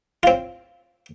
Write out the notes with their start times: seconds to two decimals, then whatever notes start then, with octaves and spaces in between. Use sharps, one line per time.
0.23 C4 F4